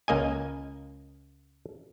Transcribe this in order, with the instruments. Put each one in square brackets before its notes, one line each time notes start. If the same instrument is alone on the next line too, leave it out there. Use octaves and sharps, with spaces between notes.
[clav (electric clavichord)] C#2 A#3 D#5 G#5